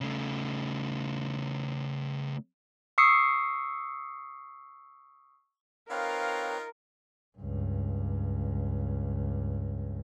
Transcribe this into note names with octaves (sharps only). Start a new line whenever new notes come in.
C#3 A3
C#6 D#6 E6 C7 C#7
C4 D#4 F4 A#4 B4 C#5 F5
C#2 G2